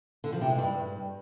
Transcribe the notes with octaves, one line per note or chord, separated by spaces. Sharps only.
D3
F3
C3
G#3
G2